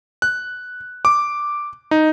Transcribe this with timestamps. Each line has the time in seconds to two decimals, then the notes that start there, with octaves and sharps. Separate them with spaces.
0.22 F#6
1.05 D6
1.91 D#4